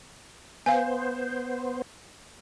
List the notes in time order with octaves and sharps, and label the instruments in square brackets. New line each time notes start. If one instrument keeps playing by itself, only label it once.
[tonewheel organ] B3 C5 [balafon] F5 G#5